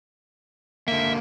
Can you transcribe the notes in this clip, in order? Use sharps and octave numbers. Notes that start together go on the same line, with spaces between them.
D3 A#3 E5